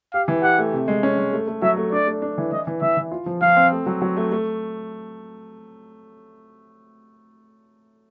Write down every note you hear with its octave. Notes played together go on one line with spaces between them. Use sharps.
G4 F5
E3
G4 F#5
A3
C3
G#3
C#4
G#3
A3
A3
F#3 E5
A3
D4 D5
A3
D4
E3
E3 D#5
E3
E3 E5
E3
F4
F3
F3 F5
C4
A3
F#3
F#3
A3
A3